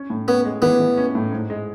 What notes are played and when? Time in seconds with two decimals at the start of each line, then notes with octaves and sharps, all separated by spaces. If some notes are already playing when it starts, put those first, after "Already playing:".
Already playing: C#4
0.10 A2
0.28 B3 C#4
0.45 G#3
0.62 E3 B3
0.79 E3
0.97 C#4
1.15 A2
1.32 G#2
1.50 G#3